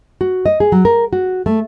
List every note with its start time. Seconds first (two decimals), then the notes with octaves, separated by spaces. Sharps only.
0.21 F#4
0.46 D#5
0.60 G#4
0.72 F#3
0.85 A#4
1.13 F#4
1.46 A3